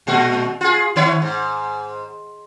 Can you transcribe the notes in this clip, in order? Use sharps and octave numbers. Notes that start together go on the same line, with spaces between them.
A#2 G#3 F#4
F4 G#4
D#3 E4 C#5
G#2